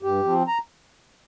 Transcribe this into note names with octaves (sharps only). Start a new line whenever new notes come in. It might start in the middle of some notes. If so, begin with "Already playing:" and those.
G2 G4
F3 C4
A#5